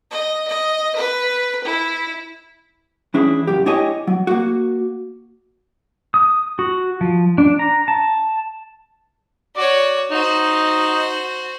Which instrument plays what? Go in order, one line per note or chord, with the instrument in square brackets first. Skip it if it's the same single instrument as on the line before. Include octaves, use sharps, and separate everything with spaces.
[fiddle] D#5
D#5
B4
E4
[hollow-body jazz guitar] E3 C#4 D4 E4 G#4
C#2 F#2 G4
D4 E4 G4 C#5 D#5 G#5
F#3
A#3 F#4
[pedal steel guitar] D#6
F#4
F3
D4
A#5
A5
[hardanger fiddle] F#4 C#5 [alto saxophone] D5
[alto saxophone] D#4 [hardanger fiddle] F#4 C5